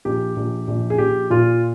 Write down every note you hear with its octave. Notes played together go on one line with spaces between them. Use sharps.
A#1 G4
A#1
A#1
G#4
A#1 G4
A#2 F4